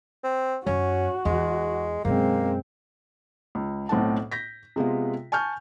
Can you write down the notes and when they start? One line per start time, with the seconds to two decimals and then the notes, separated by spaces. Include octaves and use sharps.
0.24 C4
0.67 F#2 C#4 F#4
1.25 E2 G#3
2.05 F#2 B2 G#3 A#3 C4
3.55 C#2
3.89 B1 A2 C4 F#5 A5
4.32 G6 A#6 B6
4.76 C3 G#3 B3 F4
5.32 G#5 A5 C#6 F6 G6